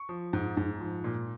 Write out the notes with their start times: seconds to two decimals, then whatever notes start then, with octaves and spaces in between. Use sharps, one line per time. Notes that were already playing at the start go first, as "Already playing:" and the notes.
Already playing: C#6
0.09 F3
0.33 G#2
0.57 G#2
0.80 F3
1.04 A#2